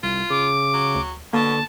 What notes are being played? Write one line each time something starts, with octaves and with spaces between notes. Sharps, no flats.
C2 F4
C#3 D6
F#3
D2
B2 D3 A#3 A5